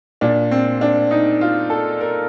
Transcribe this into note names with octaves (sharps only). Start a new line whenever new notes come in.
A#2 D4
C4
D4
D#4
F4
A4
A#4